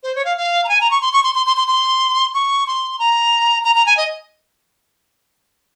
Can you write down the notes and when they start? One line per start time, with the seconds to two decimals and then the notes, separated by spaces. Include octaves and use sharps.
0.03 C5
0.15 C#5
0.25 F5
0.37 F5
0.64 A#5
0.69 G#5
0.81 A#5
0.91 C#6
1.02 C6
1.13 C#6
1.24 C6
1.35 C6
1.47 C6
1.57 C6
1.68 C6
2.34 C#6
2.67 C6
2.99 A#5
3.64 A#5
3.76 A#5
3.86 G#5
3.97 D#5